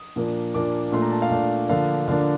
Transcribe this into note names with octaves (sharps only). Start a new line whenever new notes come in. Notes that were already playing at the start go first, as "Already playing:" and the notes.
Already playing: D#6
A#2 F3 A#3 D4
A#2 F3 A#3 D4 D6
A#2 A3 D4 C6
A#5
A5
F5
A#2 A3 D4
D3 F3 A#3 D4 F5
D3 F3 A#3 D4 F5